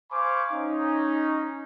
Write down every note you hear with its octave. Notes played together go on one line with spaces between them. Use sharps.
C5 F5 G#5 B5 C#6 D6
C#4 D#4